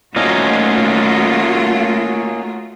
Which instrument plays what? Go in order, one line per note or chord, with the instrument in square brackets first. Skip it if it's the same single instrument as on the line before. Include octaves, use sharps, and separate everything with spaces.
[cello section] A3 F4 F#4 [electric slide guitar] A#3 C#4 D#4